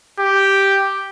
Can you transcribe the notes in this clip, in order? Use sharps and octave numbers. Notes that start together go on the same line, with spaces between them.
G4